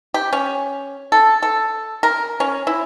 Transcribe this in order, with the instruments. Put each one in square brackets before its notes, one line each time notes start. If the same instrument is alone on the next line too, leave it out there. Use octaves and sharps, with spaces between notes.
[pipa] G4
C#4
A4
A4
A#4
C#4
E4